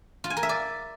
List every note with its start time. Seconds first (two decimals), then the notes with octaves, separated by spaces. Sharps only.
0.24 F4
0.30 G#5
0.37 A#4
0.43 E5
0.49 D5